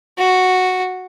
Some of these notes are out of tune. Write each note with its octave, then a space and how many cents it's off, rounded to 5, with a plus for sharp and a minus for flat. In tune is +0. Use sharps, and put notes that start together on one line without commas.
F#4 -5